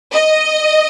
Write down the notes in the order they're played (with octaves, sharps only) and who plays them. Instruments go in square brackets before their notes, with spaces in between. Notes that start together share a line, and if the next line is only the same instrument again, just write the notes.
[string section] D#5